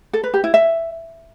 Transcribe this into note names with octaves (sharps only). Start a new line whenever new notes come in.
A4
B4
G4
E4
E5